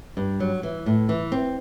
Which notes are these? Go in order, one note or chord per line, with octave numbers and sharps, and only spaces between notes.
G2
F#3
E3
A2
E3
C4